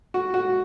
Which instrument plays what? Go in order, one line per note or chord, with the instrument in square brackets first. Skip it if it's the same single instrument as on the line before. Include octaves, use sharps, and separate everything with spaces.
[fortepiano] F#4
F#4